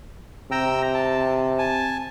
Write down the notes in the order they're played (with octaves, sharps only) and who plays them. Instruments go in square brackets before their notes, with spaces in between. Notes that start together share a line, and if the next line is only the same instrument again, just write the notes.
[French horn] C3 [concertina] G5 A#5 E6
[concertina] A5
G#5 A5